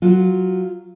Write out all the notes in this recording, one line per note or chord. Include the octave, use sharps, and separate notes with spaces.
F#3 F4